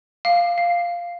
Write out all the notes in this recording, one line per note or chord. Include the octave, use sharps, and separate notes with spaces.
F5
F5